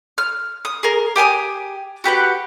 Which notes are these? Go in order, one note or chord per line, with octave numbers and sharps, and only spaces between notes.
F6
D#6
G#4 A#4
G4 G5 G#5 D#6
F#4 G4 B4 F#5